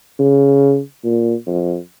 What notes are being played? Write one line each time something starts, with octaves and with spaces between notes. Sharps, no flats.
C#3
A#2
F2